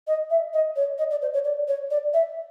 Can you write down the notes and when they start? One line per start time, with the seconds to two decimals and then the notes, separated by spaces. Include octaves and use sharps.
0.07 D#5
0.30 E5
0.53 D#5
0.76 C#5
0.98 D#5
1.11 D5
1.22 C5
1.33 C#5
1.45 D5
1.68 C#5
1.91 D5
2.13 E5